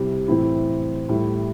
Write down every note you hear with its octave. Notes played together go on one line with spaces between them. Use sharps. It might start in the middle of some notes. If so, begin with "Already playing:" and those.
Already playing: C3 G3 E4
A2 E3 C4 E4
A2 G3 E4